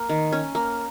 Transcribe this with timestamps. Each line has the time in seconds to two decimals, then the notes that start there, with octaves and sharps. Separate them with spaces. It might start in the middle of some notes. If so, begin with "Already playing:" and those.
Already playing: A#3
0.09 D#3
0.32 C#4
0.55 A#3